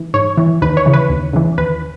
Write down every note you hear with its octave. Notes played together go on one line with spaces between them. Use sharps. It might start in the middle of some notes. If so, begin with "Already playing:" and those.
Already playing: E3
G#2 C#5
E3
D#2 B4
C#5
C#3 E3
B4
D#2
C#3 E3
D#2 B4